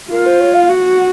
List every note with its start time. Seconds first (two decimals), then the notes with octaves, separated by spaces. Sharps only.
0.11 F4 A#4
0.26 C5
0.40 C#5
0.54 F5
0.68 F#4
0.97 F#5